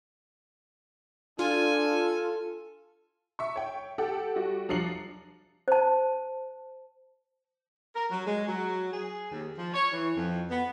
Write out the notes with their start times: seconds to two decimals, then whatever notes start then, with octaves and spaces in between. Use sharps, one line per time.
1.39 D4 F4 A4 G#5
3.39 E5 C#6
3.56 C#5 G5
3.98 G4 A4 F#5 G5
4.36 G3 F#4
4.69 F3 F#3 D4 C7 C#7 F#7
5.68 C5 A5
7.95 A#4
8.11 F#3
8.26 G#3
8.47 F#3
8.92 G#4
9.32 D#2
9.57 F3
9.74 C#5
9.92 E3
10.15 F2
10.50 B3